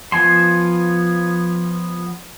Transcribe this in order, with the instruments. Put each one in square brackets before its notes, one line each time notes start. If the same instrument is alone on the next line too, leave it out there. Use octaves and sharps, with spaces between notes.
[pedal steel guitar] F3 B3 G#5 A5 C6